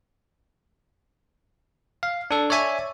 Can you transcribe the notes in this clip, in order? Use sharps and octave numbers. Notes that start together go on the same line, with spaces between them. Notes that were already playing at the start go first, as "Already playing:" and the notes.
F5
D4 A4
C#5 D5 E5 G#5